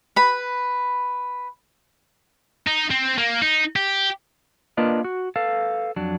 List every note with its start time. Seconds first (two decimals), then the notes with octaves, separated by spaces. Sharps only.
0.16 B4 B5
2.67 D#4
2.91 C4
3.18 A#3
3.42 D#4
3.76 G4
4.77 A#3 D4 F4 A#4 B4 D#5
5.04 F#4
5.36 A4 B4 F5
5.96 F2 F#3 D4